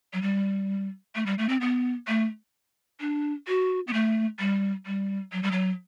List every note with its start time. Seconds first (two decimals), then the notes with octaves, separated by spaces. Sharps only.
0.13 F#3
0.22 G3
1.15 A3
1.26 G3
1.38 A3
1.49 C4
1.61 B3
2.08 A3
3.00 D4
3.48 F#4
3.87 B3
3.93 A3
4.39 G3
4.86 G3
5.32 F#3
5.43 G3
5.52 F#3